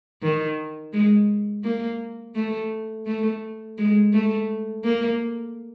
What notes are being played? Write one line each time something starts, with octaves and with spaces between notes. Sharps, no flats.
D#3
G#3
A#3
A3
A3
G#3
A3
A#3